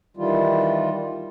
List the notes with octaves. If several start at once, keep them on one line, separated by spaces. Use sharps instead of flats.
D#3 E3 G3 F4